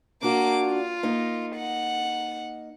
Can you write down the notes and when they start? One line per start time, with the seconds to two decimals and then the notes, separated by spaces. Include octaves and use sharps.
0.23 A#3 D4 F#4 D6
0.66 F4
1.03 A#3 D#4
1.56 F#5